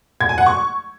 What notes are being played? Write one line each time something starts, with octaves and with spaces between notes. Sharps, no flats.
G#6
G#5
F#5
C#6